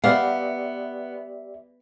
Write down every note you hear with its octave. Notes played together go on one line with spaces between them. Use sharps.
B3 G4 D5 E5 F5